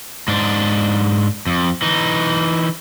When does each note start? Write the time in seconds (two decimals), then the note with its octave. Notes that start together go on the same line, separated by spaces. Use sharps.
0.28 G#2 D4
1.47 F2
1.82 E3 D#4